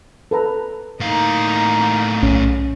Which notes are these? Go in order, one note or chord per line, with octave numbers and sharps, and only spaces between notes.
A4 B4 A#5
A2 A#3 D#4 F5
B1 C#4